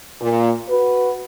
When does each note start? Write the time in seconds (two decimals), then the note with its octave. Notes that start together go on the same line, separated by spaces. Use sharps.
0.21 A#2
0.69 F#4 B4